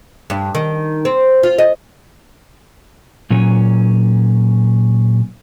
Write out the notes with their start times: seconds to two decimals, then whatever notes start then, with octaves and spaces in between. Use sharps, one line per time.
0.30 G2
0.55 D#3
1.05 C4
1.43 F4
1.58 D#5
3.30 A#2 F#3 A#3 C#4